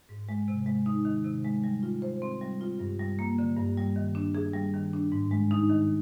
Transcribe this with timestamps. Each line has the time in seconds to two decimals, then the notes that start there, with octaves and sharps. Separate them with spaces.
0.09 G#2
0.29 G#3
0.48 C3
0.66 G#3
0.86 D#4
1.05 D#3
1.25 C3
1.45 G#3
1.64 G3
1.83 F4
2.02 C5
2.22 C4
2.41 G3
2.61 F4
2.79 G2
2.99 G3
3.19 A#3
3.39 D3
3.57 G2
3.77 G3
3.96 D#3
4.15 D4
4.35 G#4
4.54 G3
4.74 D#3
4.93 D4
5.12 G#2
5.31 G#3
5.51 D#4
5.70 D#3